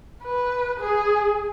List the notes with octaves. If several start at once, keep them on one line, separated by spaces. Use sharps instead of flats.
B4
G#4